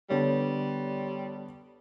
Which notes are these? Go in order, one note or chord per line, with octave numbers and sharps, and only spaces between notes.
D3 G3 B3 C#5